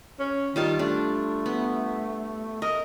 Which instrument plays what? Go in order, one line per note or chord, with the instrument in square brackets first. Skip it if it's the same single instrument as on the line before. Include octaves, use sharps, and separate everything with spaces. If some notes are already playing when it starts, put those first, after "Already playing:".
[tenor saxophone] C#4
[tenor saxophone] D#3 [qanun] G3 F4 A5
[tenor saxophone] A3 [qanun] D4
[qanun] B3
[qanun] A#4 [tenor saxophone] D#5